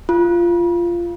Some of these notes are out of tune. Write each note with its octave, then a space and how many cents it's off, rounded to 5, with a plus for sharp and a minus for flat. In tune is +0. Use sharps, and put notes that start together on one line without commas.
F4 -15